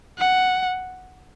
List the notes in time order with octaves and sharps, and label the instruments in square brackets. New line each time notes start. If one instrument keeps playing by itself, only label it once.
[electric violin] F#5